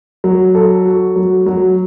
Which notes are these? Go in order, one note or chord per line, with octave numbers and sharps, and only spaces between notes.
F#3
A4
F#4
F#3
F#3